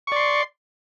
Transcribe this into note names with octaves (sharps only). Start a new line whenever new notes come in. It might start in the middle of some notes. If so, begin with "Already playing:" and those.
D5 C6 C#6